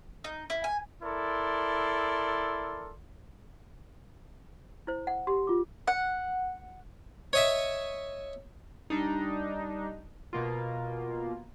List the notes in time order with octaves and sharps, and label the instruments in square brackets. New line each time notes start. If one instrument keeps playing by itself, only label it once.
[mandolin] D#4
E4
G#5
[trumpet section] E4 A4 A#4 D5 C6
[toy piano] E4 C5
F#5
[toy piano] G4 [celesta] C6
[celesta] F4 F#4 D6
[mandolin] F#5
[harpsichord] C#5 D#5 E5
[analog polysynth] G3 D4 D#4
B2 A#3 F4